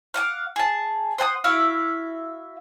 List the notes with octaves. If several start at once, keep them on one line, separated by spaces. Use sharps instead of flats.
F5 F#5 G#5 D6
G#4 A5
C5 F#5 G#5 D#6
E4 F#4 E5 F5